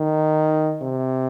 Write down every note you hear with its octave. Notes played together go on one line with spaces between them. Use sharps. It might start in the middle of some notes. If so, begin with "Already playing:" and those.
Already playing: D#3
C3